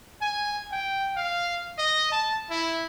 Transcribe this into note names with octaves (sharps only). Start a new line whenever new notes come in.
G#5
G5
F5
D#5
A5
E4